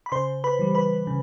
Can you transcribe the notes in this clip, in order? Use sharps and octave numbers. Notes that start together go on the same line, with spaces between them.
B5
C#3 C5 C6
B4 B5
E3 G3
B4 B5
C#3